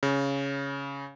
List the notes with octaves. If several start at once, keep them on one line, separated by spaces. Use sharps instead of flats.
C#3